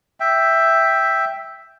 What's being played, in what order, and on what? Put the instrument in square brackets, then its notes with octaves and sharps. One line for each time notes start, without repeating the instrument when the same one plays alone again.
[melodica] E5 G5